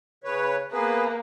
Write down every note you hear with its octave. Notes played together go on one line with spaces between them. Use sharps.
C#3 B4 C#5
A#3 B3 G#4 B4